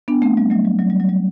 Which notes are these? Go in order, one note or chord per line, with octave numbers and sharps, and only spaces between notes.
B3 D4
A3 C4
G3
F#3 A3
G3
F#3
G3
F#3
G3